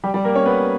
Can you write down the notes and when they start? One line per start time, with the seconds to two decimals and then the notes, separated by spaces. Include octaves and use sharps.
0.04 G3 G4
0.14 G3 G4
0.24 A#3 A#4
0.35 C#4 C#5
0.46 B3 B4